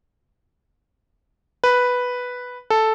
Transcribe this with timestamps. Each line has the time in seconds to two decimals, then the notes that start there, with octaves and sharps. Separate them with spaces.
1.64 B4
2.70 A4